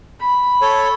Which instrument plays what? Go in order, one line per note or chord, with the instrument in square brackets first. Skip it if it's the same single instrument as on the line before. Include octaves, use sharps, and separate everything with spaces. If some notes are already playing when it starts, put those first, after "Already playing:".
[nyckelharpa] B5
[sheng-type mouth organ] A4 C#5